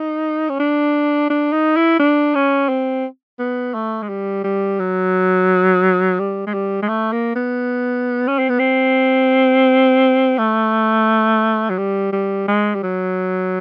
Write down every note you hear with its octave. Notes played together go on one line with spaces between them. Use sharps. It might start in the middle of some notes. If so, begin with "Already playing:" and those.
Already playing: D#4
C#4
D4
D4
D#4
E4
D4
C#4
C4
B3
A3
G#3
G3
G3
F#3
G3
G#3
G3
G#3
A3
A#3
B3
C#4
C4
B3
C4
A3
F#3
G3
G3
G#3
G3
F#3